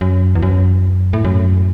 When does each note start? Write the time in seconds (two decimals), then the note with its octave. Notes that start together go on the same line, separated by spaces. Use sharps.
0.01 F#2
0.35 E2
0.42 F#2
1.13 A2
1.24 F#2